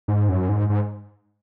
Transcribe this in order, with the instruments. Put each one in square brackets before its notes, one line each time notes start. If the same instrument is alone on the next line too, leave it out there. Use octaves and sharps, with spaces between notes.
[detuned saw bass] G#2
F#2
G#2
G#2